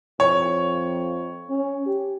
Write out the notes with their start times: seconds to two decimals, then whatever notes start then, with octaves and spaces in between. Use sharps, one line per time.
0.20 F2 C#5
1.49 C#4
1.86 G4